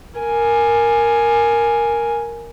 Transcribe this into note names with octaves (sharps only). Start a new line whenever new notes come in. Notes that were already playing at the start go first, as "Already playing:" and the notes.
A#4 G#5